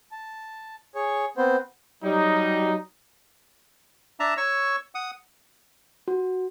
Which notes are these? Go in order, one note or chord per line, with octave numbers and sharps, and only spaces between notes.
A5
G#4 C#5
B3 C4 C5
F#3 G3 D#4
D4 E5 A5 A#5
C#5 C#6 E6
F#5 D#6
F#4